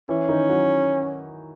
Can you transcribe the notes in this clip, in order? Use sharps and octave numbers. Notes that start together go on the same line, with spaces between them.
E3 C#4 E4
D#3 D#4
F#3 F#4